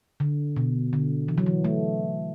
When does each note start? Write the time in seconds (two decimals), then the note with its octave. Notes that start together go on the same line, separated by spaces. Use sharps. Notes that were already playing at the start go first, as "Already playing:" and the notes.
0.20 D3
0.56 B2
0.93 D3
1.28 E3
1.38 F#3
1.46 E3
1.64 A3